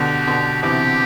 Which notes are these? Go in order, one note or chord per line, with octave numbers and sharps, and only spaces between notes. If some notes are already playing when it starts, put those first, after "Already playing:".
Already playing: B2 D3 G4
B2 D3
C3 E3 G4